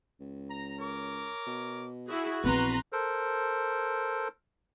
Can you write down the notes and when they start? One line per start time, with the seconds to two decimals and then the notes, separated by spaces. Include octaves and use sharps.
0.20 C#2
0.50 A#5
0.79 A#4 C#5 D6
1.47 B2
2.08 E4 F#4 G#4
2.44 A#1 E2 C4 B4 A#5 C6
2.92 A4 A#4 C5